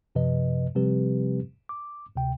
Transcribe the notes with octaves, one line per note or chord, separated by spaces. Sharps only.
F#2 C3 F3 B4 D#5
C3 F3 G3 C4 G4 B4
D6
D2 C3 G5